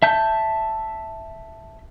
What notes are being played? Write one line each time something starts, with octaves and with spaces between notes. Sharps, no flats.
E5 A5 G6